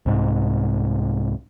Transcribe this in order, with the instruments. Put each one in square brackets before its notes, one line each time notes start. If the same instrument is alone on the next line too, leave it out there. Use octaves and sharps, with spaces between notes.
[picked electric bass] C2 G#2